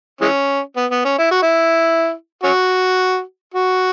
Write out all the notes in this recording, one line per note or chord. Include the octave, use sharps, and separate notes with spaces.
E3 G#3 C#4
B3
B3
C#4
E4
F#4
E4
C#4 F#4
F#4